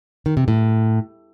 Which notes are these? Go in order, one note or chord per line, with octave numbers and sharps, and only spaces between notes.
D#3
C3
A2